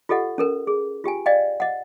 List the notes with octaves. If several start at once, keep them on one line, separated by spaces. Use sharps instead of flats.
F4 G4 A4 D#5 F#5
C#4 A4 A#4
G#4
F4 G4 G5 G#5
D5 D#5 F5 G5
D#5 F#5